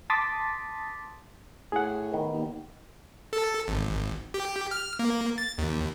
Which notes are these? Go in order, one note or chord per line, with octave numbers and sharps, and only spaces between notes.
A5 C6 D6 D#6 A6 B6
A2 G#4 F#5
D#3 B3
D#2
A4
G#1
G4
F6
A#3
A6
D#2